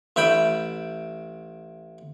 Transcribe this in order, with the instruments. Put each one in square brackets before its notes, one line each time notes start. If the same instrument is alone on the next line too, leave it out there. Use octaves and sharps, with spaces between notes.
[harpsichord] A1 E5 G5 B5